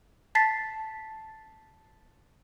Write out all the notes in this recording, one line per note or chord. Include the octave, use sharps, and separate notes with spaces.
A5 A6 B6 C7